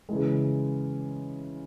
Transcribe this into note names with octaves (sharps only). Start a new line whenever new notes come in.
C#3 E3 G#3